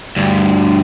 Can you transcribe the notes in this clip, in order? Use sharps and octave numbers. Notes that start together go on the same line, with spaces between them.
D2 G2